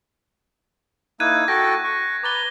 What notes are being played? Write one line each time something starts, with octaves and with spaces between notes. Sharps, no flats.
A#3 D#4 E4 F#6 G#6 D#7
F#4 A4 G5 A#6
C#6
B4 A#5 D6 A6 G7